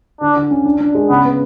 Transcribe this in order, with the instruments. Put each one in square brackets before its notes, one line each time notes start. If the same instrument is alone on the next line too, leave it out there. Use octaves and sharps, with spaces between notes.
[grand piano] D3 [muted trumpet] D4
[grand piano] D3
C#4
D4
D4
G#3
[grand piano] C#3 [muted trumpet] B3
[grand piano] B3